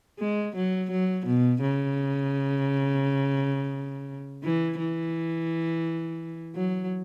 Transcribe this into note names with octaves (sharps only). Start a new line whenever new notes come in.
G#3
F#3
F#3
B2
C#3
E3
E3
F#3